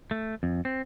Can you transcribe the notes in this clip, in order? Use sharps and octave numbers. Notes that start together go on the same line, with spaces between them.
A3
F2
C4